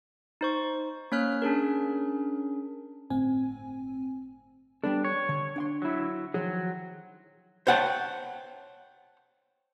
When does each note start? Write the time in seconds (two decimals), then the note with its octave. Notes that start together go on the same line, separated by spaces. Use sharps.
0.41 D#4 C5 C#6
1.12 A#3 C#4 C#5 F6 F#6
1.42 C#4 D4 G#4 A#4
3.10 G1 A2 C4 G#5
4.84 G3 B3 D4 A4
5.05 C#5
5.29 D3
5.56 D4 F#5 C6
5.82 F#3 E4
6.34 D#3 F3 F#3 G#4
7.67 C5 C#5 F#5 G5 A5